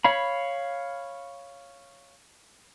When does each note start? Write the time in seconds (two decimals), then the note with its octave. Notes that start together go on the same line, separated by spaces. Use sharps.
0.05 C#5 F5 B5